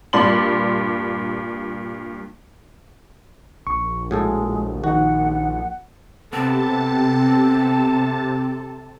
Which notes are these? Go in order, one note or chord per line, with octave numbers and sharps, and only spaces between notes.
G2 A#2 D5 C6 F#7
A#1 C#6
A2 G#3 F#4 G#4 A4
D#3 D#4 F#4 F#5
C3 B3 C4 A4 A5